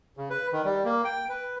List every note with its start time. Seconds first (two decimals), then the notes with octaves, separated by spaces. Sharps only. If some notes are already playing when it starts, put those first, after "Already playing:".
0.17 C#3
0.30 B4
0.53 D#3
0.64 G3
0.85 A#3
1.05 G5
1.29 B4